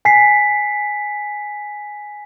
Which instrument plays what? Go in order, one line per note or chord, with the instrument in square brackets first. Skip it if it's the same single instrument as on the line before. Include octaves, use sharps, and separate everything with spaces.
[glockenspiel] G#5 B6 C7